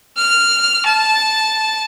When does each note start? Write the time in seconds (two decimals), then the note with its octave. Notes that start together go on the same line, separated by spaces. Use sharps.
0.17 F6
0.86 A5